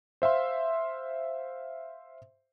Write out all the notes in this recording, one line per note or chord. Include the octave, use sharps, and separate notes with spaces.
C5 E5 F5 C6